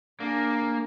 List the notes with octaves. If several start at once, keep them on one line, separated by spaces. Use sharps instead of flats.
A#3 D4 G#4